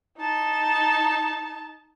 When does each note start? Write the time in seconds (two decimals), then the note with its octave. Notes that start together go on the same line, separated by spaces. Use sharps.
0.18 D#4 A5